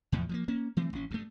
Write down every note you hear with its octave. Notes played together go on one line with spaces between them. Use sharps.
E2 A2 F3
F3 G3 A#3
A#3 C#4
E3 A3 C4
A1 C#4
D2 G2 A3